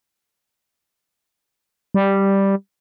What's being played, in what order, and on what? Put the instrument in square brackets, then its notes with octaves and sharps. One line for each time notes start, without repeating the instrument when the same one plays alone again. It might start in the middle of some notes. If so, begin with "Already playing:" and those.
[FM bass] G3